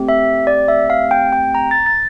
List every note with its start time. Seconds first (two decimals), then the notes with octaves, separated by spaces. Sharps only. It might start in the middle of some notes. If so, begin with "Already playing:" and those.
Already playing: A3 C4 G4
0.09 E5
0.47 D5
0.68 E5
0.90 F5
1.11 G5
1.33 G5
1.55 A#5
1.71 A6
1.86 A6